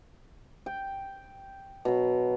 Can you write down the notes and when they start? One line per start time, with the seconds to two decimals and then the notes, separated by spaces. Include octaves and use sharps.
0.66 G5
1.85 B2 F#3